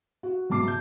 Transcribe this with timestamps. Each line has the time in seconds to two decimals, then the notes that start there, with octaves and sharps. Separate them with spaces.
0.23 F#4
0.50 F#1 G#2 B2 A5 D6 C7
0.64 A5 G6